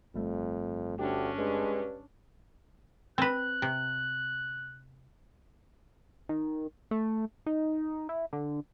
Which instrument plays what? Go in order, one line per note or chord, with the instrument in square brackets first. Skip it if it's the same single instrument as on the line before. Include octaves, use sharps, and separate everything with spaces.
[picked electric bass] G1 G3 A3 [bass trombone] F2
[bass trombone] D2 [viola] C#4 D4 [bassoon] G4
[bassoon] G2 [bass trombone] G#3
[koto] C4 B4 [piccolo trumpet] F#6
[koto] C3
[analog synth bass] D#3
A3
D#4
E4
D3